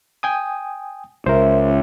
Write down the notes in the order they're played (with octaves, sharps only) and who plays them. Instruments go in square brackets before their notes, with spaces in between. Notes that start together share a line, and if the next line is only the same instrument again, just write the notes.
[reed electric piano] G5 G#5 D#6
[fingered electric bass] C#2 [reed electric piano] A#4 C5 [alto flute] E5